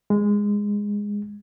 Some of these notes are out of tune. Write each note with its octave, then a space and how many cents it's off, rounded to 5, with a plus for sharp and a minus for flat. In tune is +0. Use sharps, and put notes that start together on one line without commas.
G#3 -15